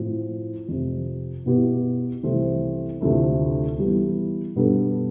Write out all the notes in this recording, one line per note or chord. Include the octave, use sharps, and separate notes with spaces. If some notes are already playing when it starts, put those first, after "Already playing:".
Already playing: A2 F3 C4
F2 C3 F3
B2 B3 E4 G4
C2 C3 E3 A3 C4
D2 C3 F3 A3 E4
E3 G3 B3
B2 G3 B3 D4 A4